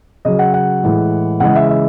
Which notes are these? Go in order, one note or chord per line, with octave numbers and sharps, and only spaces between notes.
C#3 F#3 D#5
F#5
F#5
A2 E3 G#3
C#3 E3 G#3 F#5
E5
E5